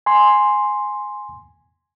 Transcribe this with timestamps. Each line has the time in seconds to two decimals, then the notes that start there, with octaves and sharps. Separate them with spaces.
0.06 G#5 C6